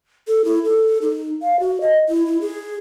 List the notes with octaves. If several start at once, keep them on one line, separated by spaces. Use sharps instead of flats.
A4
E4
A4
D#4
F5
F#4
D#5
E4
E4
G#4